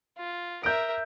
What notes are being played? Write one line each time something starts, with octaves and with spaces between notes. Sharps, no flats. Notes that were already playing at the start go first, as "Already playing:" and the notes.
F4
A#4 E5 G6 D7